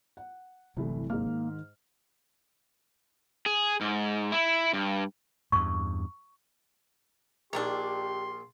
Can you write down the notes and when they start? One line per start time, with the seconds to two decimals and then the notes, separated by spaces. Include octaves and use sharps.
0.17 F#5
0.77 G1 C2 C3 E3 F#3 A3
1.10 G#2 A#3 D#4 F6
1.27 D#3
3.46 G#4
3.81 G#2
4.32 E4
4.73 G2
5.52 E2 G2 C#6
7.53 A#1 A#2 D#3 A#3 D4 G4 C6